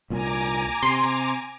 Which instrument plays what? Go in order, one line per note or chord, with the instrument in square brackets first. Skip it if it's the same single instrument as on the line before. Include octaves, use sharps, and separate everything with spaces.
[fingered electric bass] C2 A#2 [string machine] G#5 A#5 D6
[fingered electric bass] C3 [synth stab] C6